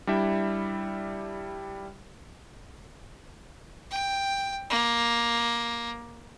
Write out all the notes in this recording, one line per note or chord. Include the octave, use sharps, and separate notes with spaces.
G3 D4 E4 E5 G5
G5
A#3